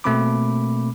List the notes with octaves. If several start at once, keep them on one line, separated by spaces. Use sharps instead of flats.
B2 A3 A#3 C4 B5 D6